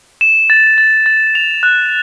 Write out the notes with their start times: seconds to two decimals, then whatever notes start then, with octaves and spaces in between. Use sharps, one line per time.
0.21 E7
0.50 A6
0.78 A6
1.06 A6
1.35 F7
1.63 F#6